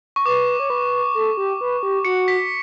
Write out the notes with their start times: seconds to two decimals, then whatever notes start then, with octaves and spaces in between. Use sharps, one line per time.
0.16 C#6
0.25 B4 D6
0.59 C#5
0.70 B4
1.15 A4
1.37 G4
1.61 B4
1.83 G4
2.05 F#4 C#7
2.28 B6